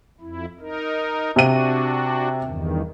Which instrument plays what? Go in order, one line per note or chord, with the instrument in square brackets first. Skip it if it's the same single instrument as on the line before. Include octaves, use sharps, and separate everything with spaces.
[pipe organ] F2 E4
D#4 A#4
[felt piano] C3 D#7 [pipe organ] D4 F#4
[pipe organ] E2 G2 D#3